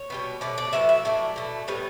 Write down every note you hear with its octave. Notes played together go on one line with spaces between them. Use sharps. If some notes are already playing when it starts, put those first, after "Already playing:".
Already playing: C#5
B2 G3 B3
B2 A3 D5
D5
A2 F#3 B3 E5
E5
A2 F#3 A3 D5
B2 A3
A2 G3 B3 C#5